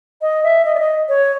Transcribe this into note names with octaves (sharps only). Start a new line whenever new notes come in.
D#5
E5
D#5
D5
D#5
C#5